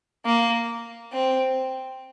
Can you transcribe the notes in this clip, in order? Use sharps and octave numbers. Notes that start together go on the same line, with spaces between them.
A#3
C4